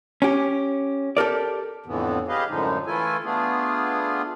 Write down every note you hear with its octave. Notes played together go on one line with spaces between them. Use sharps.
C#4 G4
G4 A4 A#4 D5
F2 A2 D3 E3 B3
G4 G#4 B4 D#5 F5
F#2 A2 D3 F3 G#3 D#4
E3 A3 E4 F4 A4 G#5
A3 B3 D4 F4 G#4